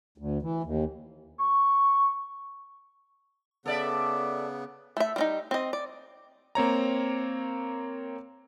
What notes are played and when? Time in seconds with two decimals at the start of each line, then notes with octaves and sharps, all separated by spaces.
0.18 D2
0.42 E3
0.63 D#2
1.39 C#6
3.66 C#3 B3 A4 D5 E5
4.97 A3 E5
5.16 G3 C4 D#4
5.51 C4 D#5
5.73 D5
6.55 A#3 C4 C#5 A#5